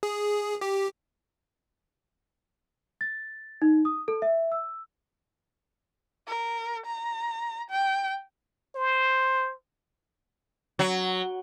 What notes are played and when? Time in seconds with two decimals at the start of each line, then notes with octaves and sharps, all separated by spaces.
0.03 G#4
0.61 G4
3.01 A6
3.62 D#4
3.85 D#6
4.08 A4
4.22 E5
4.52 E6
6.27 A#4
6.86 A#5
7.70 G5
8.76 C5
10.79 F#3